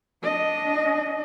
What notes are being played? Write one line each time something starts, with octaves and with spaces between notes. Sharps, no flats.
D4 D#5